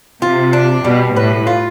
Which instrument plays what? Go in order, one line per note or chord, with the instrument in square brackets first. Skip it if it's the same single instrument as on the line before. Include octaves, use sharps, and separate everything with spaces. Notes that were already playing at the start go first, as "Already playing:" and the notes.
[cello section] C3 [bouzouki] F4
[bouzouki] D4
[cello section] B2 [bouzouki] G3
[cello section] A2 [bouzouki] B4
[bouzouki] F4